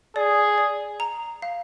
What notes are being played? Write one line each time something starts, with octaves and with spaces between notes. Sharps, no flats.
G#4 D5
D5
A#5
F5